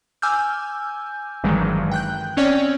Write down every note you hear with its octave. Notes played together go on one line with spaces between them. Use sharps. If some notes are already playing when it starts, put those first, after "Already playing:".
G#5 D6 E6 F6 G6
G#1 G2 D#3 E3 F#3 G#3
G5 F#6 G6
C4 C#4 C#5 D5 G5